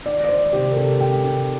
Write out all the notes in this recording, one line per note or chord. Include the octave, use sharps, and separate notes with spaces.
D#3 D5
D5
D#3 C5
C3 G4
A#4
C3 A4
C3 G5
C3